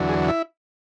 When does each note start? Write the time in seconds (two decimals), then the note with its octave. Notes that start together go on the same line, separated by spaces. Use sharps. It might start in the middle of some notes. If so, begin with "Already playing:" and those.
Already playing: E2 D3 F#3
0.09 G#4
0.28 E4